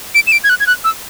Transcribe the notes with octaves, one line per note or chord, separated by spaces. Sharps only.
D7
E7
D7
G#6
F#6
G#6
F#6
E6